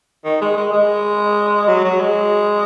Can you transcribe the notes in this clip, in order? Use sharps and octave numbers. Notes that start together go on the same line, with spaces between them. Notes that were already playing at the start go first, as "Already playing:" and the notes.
D#3
G#3
G#3
G#3
F#3
F#3
G#3